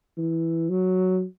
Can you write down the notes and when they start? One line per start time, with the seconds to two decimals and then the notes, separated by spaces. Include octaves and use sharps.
0.18 E3
0.70 F#3